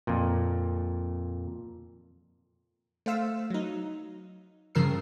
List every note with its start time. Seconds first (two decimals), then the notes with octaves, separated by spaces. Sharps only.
0.07 F2 A#2
3.06 A3 C5 F5 E6
3.50 F#3 D#4
4.75 G2 C#3 F3 A#4 E6 C7